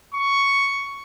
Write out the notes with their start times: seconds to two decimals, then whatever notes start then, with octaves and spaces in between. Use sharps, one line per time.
0.14 C#6